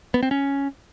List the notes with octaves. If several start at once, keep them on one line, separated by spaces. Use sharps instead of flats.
B3
C4
C#4